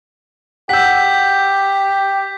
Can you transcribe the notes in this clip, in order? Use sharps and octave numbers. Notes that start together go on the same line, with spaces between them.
G4 F#5 E6 G6 B6